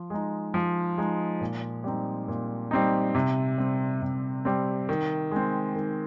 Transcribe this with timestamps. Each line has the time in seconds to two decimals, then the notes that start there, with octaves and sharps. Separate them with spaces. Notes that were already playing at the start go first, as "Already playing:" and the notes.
Already playing: F3
0.10 G#3 D#4
0.54 F3
0.98 G#3 D#4
1.41 A#2
1.84 G3 C4 D#4
2.28 A#2
2.71 G3 C4 D#4
3.15 C3
3.58 G3 C4
4.02 C3
4.45 G3 C4
4.89 D#3
5.31 G#3 C4
5.76 D#3